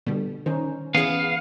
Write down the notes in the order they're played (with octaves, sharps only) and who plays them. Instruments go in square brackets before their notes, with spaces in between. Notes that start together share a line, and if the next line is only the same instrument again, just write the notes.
[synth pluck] B2 G3 [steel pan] D3
[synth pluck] D#3 [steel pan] C#4 D#4 C5
[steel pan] E3 [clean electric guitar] B3 [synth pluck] C#4 G#4 [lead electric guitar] F5